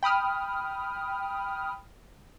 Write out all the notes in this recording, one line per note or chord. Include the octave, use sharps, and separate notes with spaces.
G5 B5 D#6 F6